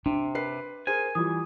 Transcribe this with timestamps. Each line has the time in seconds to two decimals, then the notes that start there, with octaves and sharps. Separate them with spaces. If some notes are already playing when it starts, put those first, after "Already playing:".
0.06 C3 D4
0.35 B4 C7
0.87 G#4 A#4 C5 G#5
1.15 E3 G3 F4 D#6